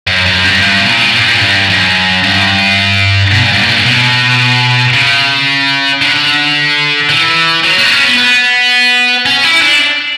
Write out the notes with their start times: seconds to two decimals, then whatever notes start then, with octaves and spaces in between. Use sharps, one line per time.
0.07 F#2
0.26 F#2
0.44 G2
0.61 G2
0.79 B2
0.89 A#2
1.15 G2
1.28 A#2
1.40 G2
1.70 F#2
2.24 G2
3.31 B2
3.42 A#2
3.53 G2
3.63 A#2
3.80 C#3
3.86 B2
4.93 C#3
6.01 D3
7.10 E3
7.64 F#3
7.78 A#3
7.85 B3
7.91 C#4
8.04 B3
8.17 B3
9.26 C#4
9.44 E4
9.62 D4